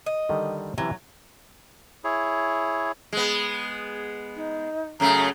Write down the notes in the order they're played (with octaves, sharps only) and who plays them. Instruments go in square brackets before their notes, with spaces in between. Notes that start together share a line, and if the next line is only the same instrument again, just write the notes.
[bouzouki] D#5
[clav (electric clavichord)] D3 D#3 G3
[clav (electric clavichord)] C3 E3 C#4 [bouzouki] F#3
[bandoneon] E4 G#4 C#5
[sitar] G#3 B3
[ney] D#4
[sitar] F#2 C#3 A3 [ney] A#5